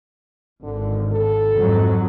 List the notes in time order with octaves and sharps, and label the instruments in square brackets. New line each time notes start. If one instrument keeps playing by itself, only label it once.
[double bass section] G#1 [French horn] D3
[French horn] A4
[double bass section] F2 G#2 F#3